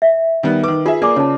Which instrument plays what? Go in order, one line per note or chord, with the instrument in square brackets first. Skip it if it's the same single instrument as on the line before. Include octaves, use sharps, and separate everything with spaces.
[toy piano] E5
[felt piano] D#3 G3 B3
[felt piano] D#3 D6 [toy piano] B4
[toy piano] F4 [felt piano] G#4 E5
[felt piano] A#3 G#4 [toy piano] D5 D6
[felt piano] C#3 [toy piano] C#5 A5